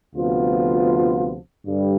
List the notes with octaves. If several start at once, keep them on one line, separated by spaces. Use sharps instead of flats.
D2 C3 F3 B3 F4
G2 D3 G3